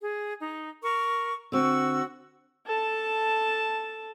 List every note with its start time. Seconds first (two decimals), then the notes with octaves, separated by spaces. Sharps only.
0.01 G#4
0.40 D#4
0.82 A#4 C#6
1.52 D3 C4 F#4 C#6 E6
2.66 A4 A5